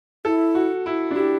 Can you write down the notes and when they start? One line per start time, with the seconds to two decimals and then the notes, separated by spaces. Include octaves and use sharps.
0.25 E4 A4
0.55 F#4
0.86 E4
1.11 D4
1.15 E4 G4